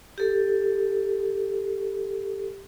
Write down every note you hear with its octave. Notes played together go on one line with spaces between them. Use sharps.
G4 A4